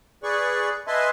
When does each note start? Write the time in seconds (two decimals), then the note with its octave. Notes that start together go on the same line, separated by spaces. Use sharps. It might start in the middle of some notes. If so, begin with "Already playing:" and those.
0.23 G#4 B4 D5 C#6
0.87 B4 D#5 E5 G#5 A5 C6